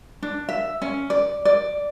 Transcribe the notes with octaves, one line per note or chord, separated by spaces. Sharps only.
D4
E5
C#4
D5
D5